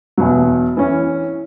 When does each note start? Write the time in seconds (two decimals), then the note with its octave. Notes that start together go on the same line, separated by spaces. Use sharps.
0.17 E2 B2 F#3
0.77 E3 C#4